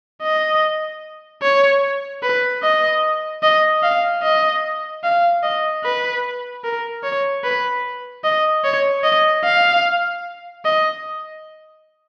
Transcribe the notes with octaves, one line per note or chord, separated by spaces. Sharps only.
D#5
C#5
B4
D#5
D#5
F5
D#5
F5
D#5
B4
A#4
C#5
B4
D#5
C#5
D#5
F5
D#5